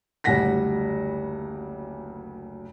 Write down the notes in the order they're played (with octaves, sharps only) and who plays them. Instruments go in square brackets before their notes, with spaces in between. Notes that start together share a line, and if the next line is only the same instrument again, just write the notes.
[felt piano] F#1 D2 G3 F#5 A#6 B6